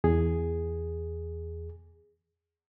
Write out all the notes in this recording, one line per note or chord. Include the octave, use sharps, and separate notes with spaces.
E2 G#4